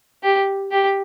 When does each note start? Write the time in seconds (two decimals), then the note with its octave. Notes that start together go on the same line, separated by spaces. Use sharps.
0.23 G4
0.71 G4